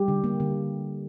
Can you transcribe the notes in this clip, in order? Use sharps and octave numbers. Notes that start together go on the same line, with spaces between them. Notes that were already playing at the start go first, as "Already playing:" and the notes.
Already playing: G3 G4
D3
A#3
D3